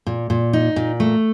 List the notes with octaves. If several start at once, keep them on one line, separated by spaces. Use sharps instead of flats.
A#2
A#2
D#4
A#2
A3